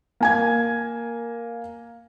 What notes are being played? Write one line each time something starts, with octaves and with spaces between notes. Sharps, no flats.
A#3 G#5 G#6